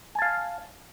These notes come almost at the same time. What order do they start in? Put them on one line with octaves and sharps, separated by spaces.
G#5 A5 F5